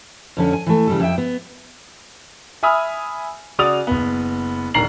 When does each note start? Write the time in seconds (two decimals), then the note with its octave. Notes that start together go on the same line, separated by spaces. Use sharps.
0.37 F2 D3 C#4
0.53 G#5
0.66 E3 A3
0.87 C#3 G3 A4
1.00 F2 E5 G5
1.18 B3
2.63 E5 G#5 B5 D#6 F6
3.59 C#3 F#4 D5 D#6 F7
3.87 F#1 B3
4.74 D1 D#3 D4 A#5 C7 F#7